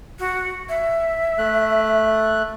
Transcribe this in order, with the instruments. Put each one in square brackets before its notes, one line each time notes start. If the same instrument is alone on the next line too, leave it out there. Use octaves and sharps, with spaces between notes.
[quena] F#4
E5
[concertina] A3 F#6